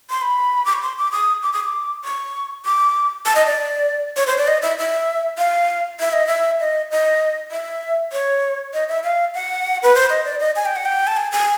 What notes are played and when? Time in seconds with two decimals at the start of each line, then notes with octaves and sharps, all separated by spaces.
0.10 C6
0.22 B5
0.65 D6
0.73 C#6
0.82 C6
0.98 D6
1.12 D#6
1.43 D6
1.53 D#6
1.64 D6
2.04 C#6
2.65 D6
3.26 A5
3.35 D#5
3.46 D5
4.17 C#5
4.27 C5
4.37 D5
4.47 D#5
4.62 E5
4.78 E5
5.38 F5
6.00 E5
6.13 D#5
6.27 E5
6.60 D#5
6.91 D#5
7.51 E5
8.12 C#5
8.73 D#5
8.89 E5
9.04 F5
9.35 F#5
9.83 B4
9.95 C5
10.10 D#5
10.25 D5
10.40 D#5
10.56 G#5
10.65 G5
10.76 F#5
10.85 G5
11.07 A5
11.17 G#5
11.32 G#5